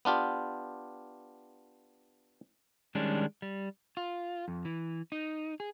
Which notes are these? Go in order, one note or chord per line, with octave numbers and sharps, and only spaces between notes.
B3 D4 F4 G4
D#3 G3 G#3 C#4 D4
G3
F4
F2
E3
D#4
G#4